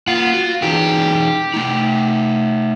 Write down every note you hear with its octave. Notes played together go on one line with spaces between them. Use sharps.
A#3 F4 F#5
F#4
E3 D#4 G4 G#4
A3 D#4